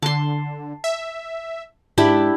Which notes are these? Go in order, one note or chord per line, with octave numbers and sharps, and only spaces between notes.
D3 A5 C6
E5
G#2 D4 E4 G4